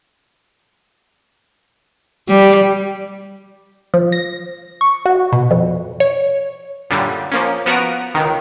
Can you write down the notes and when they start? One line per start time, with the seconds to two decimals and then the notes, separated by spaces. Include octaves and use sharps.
2.29 G3
3.94 F3
4.12 A#6
4.81 C#6
5.06 F#4
5.32 B2
5.51 F2
6.00 C#5
6.90 F#2 A#2 D3 G3
7.32 F3 A#3 C#4
7.66 F3 B3 F#4 A#5 D7 D#7
8.15 C#2 D#3